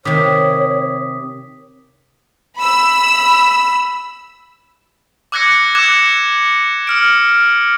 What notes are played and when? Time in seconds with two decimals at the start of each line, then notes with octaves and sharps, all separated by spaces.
0.05 C3 D#3 C#5 D6 D#6 B6
2.57 B5 E6
5.32 D6 E6 F#6 G#6 A#6 C#7
5.75 D6 E6 F#6 G#6 E7
6.87 E6 F6 D7